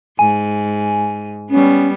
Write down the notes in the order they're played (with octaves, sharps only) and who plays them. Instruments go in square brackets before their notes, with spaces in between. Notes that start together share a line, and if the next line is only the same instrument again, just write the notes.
[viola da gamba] G#2 [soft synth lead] G#5
[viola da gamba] G3 B3 [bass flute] C#4